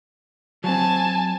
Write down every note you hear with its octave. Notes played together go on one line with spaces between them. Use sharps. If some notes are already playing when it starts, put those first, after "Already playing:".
F#3 C4 G#5 A5